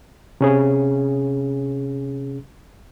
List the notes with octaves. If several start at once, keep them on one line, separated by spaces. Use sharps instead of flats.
C3 C#4 G#4